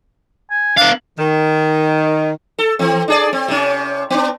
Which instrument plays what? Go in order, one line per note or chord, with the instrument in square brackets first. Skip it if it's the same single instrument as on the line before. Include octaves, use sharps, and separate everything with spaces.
[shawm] G#5
[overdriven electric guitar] B3 F5 [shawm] D4
[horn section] D#3
[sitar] A4
E3 C4
D4 G#4 D5
C4
C3 C#4
B3 D4